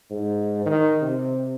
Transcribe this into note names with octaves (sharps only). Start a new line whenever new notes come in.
G#2
D#3
C3